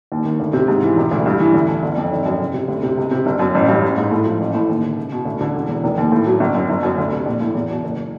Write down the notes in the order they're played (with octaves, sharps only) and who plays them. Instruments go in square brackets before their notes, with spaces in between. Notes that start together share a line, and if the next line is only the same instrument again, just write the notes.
[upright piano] D#2
D#3
D2
C3
G#2
E3
E1
D2
G2
E3
D2
D3
G1
F2
G#1
F#2
C#2
C3
D2
C3
C#2
C3
G1
F#2
A1
G2
A1
G#2
A2
F3
A1
A2
D#2
D3
C#2
B2
D2
D3
E1
E2
F1
D#2
A2
F#3
G1
F#2
G1
F#2
D2
C3
A#1
A2
E2
B2
F#1